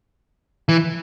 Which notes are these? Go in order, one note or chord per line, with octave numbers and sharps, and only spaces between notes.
E3